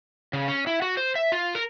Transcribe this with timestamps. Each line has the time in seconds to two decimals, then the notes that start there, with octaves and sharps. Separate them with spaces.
0.33 C#3
0.48 C#4
0.67 E4
0.82 F#4
0.97 C5
1.16 E5
1.32 F4
1.55 A#4